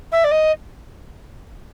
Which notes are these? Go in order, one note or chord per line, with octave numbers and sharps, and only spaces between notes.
E5
D5
D#5